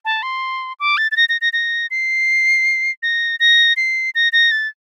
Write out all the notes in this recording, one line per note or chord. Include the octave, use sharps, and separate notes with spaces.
A5
C6
D6
A6
A6
A#6
A#6
A#6
A#6
C7
A#6
A#6
C7
A#6
A#6
A6